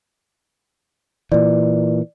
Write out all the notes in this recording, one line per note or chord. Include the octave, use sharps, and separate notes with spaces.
A#2 E3 D5